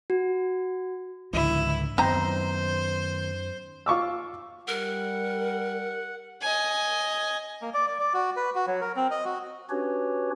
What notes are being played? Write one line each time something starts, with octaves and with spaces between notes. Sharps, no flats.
F#4
C#2 G#2 D3 E3 E4
F#2 D#3 B3 C4 D#4 C5 A#5
F4 C#6 D6 E6
G3 A#4 F#5
D#5 G#5
A#3
D5
D5
D5
F#4
B4
F#4
F#3
A#4
C4
D#5
F#4
C#4 D4 F#4 G4 B4 C#5